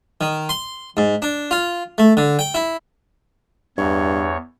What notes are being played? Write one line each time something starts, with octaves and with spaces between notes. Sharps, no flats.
D#3
C6
G#2
D4
F4
A3
D3
G5
E4
E2 G2 C#5